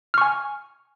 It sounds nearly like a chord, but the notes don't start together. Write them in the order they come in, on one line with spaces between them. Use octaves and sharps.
F6 C#6 G#5